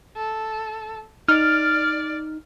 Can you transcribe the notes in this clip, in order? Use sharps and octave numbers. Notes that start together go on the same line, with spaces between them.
A4
D#4 D5 F6